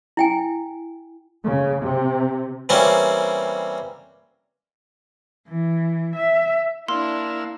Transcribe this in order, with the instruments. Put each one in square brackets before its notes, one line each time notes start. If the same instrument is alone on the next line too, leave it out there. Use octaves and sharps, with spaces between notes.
[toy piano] E4 G5 G#5
[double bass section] C#3
C3
[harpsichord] E3 G3 A#3 C4 C#4
[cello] E3
E5
[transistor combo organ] A#3 F5 E6 [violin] D4 E4 [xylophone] C6